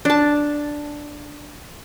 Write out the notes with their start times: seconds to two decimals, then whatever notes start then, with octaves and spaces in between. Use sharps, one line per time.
0.05 D4 A5